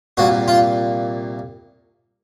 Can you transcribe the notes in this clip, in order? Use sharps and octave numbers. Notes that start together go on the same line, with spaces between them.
C2 A#2 F#4
F4